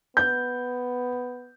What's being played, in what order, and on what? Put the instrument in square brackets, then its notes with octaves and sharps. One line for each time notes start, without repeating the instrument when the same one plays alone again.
[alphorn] B3 [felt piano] G6